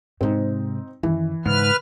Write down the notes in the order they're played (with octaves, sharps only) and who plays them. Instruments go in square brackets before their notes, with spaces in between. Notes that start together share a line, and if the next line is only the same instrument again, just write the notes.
[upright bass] G#2 C3 [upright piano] C4 D#4
[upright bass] F#2 D#3 [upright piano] E3
[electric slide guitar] G#2 [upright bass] C#3 [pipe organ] B4 F6